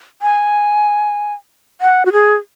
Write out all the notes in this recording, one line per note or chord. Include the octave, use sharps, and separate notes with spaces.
G#5
F#5
F#4
G#4